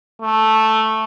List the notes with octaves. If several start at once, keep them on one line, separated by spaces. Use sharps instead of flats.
A3